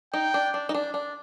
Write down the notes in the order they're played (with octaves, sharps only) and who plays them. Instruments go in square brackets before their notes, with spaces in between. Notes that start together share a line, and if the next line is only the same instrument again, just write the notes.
[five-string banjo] D#4 [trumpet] G5
[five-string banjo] D4
D4
D#4
D4
D4